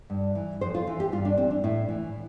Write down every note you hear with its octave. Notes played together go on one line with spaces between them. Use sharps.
G2
E3
F2 C5
F4
E3 F4
G4
G2 F4
D4
E3 C4
D4
A2 E4
E3